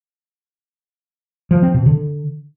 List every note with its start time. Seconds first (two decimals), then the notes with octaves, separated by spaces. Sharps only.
1.51 F3
1.63 C4
1.74 B2
1.86 D3